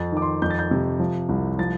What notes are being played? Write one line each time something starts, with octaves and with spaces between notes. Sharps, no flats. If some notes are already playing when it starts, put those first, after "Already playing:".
Already playing: F2 A6
D#3 D6
C6
F2 G6
A6
G6
C3
F3
C2
F3 A6